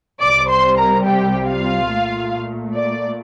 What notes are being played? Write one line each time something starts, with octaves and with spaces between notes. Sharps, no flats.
C2 C3 G3 D5 D6
C5 C6
A#4 A#5
G4 G5
F4 F5
A#2 A3
D5